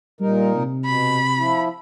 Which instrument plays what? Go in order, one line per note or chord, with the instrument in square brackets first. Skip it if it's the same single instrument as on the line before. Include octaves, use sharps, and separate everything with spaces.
[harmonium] A#2 D#4 A#4 [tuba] G3
[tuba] C3
[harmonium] B2 [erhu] B5
[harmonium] F3 E4